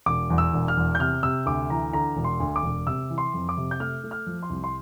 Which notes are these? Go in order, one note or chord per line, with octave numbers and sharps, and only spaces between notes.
E1 D6
E2
E6
E1
F6
E2
G6
C3 F6
C3 E6
D2 D6
E3 A#5
D3 A#5
E1
C6
D2
D6
E1
C3 E6
E3
C6
F2
D6
C3
G6
A3 F6
A3
F6
F3
C6
C2
C6